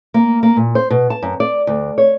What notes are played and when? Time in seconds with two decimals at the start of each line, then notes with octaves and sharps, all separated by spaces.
0.14 A#3
0.43 A#3
0.57 A#2
0.75 C5
0.90 B2
1.10 A5
1.23 F#2
1.40 D5
1.67 D2
1.98 C#5